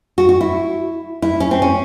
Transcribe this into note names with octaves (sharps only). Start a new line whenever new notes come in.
F#4
F#4
E4
E4
C#4
C4
C#4